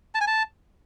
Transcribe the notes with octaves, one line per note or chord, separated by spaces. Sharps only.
A5
G#5
A5